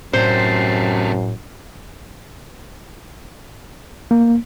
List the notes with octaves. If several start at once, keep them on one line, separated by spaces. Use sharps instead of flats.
F#2 A2 C3 A3 C5
A#3